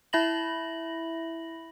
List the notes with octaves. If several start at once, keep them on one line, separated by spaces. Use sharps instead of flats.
E4 E5 B5 A#6 F#7